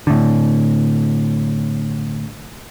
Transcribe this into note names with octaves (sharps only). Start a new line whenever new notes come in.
A2 D3